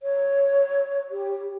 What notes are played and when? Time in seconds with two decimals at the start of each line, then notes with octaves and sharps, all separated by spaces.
0.02 C#5
1.11 G4